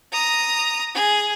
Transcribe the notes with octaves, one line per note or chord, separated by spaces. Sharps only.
A#5 D#6
G#4